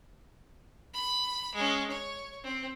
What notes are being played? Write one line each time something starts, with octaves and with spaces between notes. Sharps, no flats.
B5
G#3 C#4
C#5
C4